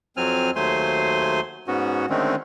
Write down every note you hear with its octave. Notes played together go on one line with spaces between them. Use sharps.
F2 F#3 C4 G#5 F6
D#2 F#3 A3 C5 G#5 C6
G#2 B3 C#4 F#4
D3 D#3 G#3 A3 C4 C#4